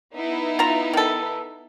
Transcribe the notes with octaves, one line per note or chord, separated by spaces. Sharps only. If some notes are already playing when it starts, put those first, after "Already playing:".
B3 D#4 E4
F4 E5 A#5
D#3 A4